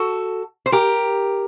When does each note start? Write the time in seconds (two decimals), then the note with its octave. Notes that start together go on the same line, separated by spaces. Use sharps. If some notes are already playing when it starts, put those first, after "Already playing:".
Already playing: F#4 A4
0.66 C5
0.72 G4 A#4